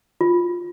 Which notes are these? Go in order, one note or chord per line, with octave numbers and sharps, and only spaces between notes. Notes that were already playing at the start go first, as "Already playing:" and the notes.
F4